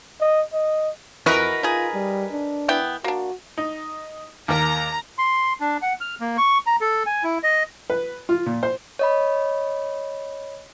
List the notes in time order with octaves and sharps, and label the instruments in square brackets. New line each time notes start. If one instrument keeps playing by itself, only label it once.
[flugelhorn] D#5
D#5
[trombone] F2 [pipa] E3 F#4 [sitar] A#4 B4 D#5
[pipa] D#4 G#4 [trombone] F4
[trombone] G3
D4
[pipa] E3 B3 G5
[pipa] A#3 D4 [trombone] F#4
[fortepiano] D#4
[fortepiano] D#2 A#4 [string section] A#5
[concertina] C6
D4
F#5
F6
A#3
C#6
A#5
A4
G#5
E4
D#5
[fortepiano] B4
F4
A#2
C5
[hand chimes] C#5 D#5 B5